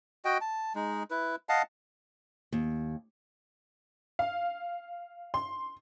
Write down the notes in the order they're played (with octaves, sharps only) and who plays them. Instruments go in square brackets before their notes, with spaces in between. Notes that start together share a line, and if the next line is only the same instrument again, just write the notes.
[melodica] F#4 D#5 G5
A5
G#3 D#4
E4 B4
D#5 F5 F#5 A5
[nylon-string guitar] D#2
[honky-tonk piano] F5
C6